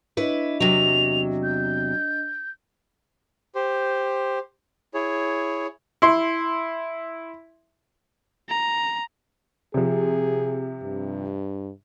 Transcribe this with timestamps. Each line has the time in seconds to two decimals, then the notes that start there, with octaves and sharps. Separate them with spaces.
0.17 D4 E4 B4 C#5 D#5
0.60 E2 C3 F#3 F7
1.43 G6
3.55 G4 C5
4.94 E4 G#4 C#5
6.02 E4 C6
8.49 A#5
9.74 C3 F3 G#4
10.82 G2